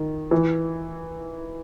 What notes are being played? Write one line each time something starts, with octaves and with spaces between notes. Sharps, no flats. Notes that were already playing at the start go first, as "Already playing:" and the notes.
Already playing: D#3
E3